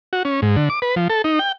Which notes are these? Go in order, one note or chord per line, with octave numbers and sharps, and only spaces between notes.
F#4
C#4
G#2
D3
D6
B4
F3
A4
D#4
G5